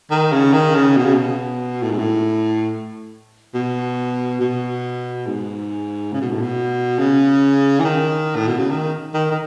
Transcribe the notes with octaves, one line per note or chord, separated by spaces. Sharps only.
D#3
C#3
D#3
C#3
B2
C#3
B2
A2
G#2
A2
B2
B2
G#2
C#3
B2
A2
B2
C#3
E3
D#3
A2
B2
C#3
D#3
D#3
D#3